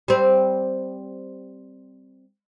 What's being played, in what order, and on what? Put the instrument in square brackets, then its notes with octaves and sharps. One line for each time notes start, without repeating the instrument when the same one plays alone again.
[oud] G3 C4